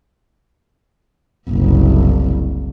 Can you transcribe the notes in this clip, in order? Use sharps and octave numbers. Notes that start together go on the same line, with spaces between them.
F#1 C2